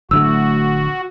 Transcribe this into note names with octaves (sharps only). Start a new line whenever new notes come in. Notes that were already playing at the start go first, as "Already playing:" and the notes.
D1 D2 A3 F#4 E6